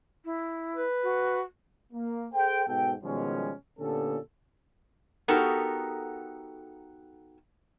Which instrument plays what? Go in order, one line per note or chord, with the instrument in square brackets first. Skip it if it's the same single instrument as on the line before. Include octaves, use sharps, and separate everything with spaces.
[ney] E4
[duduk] B4
[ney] F#4
[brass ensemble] A#3
G#4 A4 C5 G5
G#2 B2 A4 G5
B2 D#3 F3 G3 G#3 C#4
A#2 D3 B3 C#4 G4 A4
[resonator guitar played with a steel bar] B3 D#4 F#4 G4 A4 A#4